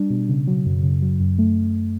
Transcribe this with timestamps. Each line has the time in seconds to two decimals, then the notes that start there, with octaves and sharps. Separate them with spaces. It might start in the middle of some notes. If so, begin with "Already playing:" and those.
Already playing: G3 D4
0.10 B2
0.29 C#3
0.47 F#3
0.66 F#2
0.83 C#3
1.02 F#3
1.20 F#2
1.38 A3